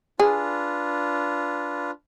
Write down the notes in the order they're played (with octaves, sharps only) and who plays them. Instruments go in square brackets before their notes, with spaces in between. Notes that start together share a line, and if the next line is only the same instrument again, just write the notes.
[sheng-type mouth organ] D4 F4 B4 [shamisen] G#4